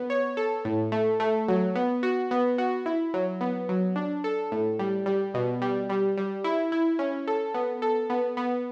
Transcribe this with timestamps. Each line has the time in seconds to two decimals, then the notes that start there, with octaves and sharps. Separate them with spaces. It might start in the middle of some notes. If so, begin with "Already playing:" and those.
Already playing: B3
0.10 C#5
0.37 A4
0.65 A2
0.92 A3
1.20 A3
1.48 F#3
1.75 B3
2.03 F#4
2.31 B3
2.58 F#4
2.86 E4
3.14 F#3
3.41 B3
3.69 F#3
3.96 D4
4.24 A4
4.52 A2
4.79 G3
5.06 G3
5.34 B2
5.62 G3
5.90 G3
6.17 G3
6.44 E4
6.72 E4
6.99 C#4
7.27 A4
7.54 B3
7.82 A4
8.10 B3
8.37 B3